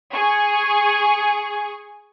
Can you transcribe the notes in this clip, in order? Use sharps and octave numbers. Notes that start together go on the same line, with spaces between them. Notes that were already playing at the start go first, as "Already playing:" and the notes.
G#4 G#5 C#6